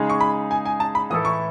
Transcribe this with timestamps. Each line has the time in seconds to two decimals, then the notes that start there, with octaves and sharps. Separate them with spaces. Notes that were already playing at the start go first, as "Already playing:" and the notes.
Already playing: C#3 G#3 D#4 G#4
0.10 C#6
0.21 B5
0.51 G#5
0.66 G#5
0.80 A5
0.95 B5
1.10 A2 E3 A3 E4 A4 D#6
1.25 C#6